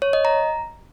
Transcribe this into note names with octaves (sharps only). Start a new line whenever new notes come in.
C#5
D#5
A#5